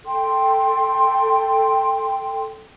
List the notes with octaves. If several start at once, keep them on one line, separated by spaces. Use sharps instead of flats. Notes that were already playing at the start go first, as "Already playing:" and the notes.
A4 G5 C6